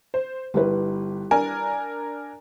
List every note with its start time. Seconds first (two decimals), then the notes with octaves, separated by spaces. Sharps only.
0.14 C5
0.54 G1 G3 E4 B4
1.31 D4 A#4 G#5